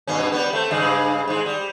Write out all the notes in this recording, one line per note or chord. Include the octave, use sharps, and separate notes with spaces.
G2 B2 C#4
G3 B3
A3 C4
G2 C#3 G#3
G#2 G#3
G3